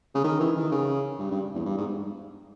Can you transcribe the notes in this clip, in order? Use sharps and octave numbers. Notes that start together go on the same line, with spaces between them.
C#3
D#3
E3
D#3
C#3
G2
G2
E2
G2
G#2